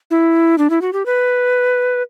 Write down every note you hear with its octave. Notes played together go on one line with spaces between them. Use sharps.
E4
D4
E4
F#4
G4
B4